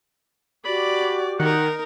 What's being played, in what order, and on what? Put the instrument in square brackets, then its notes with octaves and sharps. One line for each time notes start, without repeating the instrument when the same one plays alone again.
[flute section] F#4 G4 D6 [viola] D5 [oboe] B5
[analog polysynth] D#3 [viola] D#4 A#4 [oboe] F#5